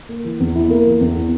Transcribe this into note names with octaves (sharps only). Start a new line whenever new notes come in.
A#3
E3
E2
E4
A#3
E3
E2
E4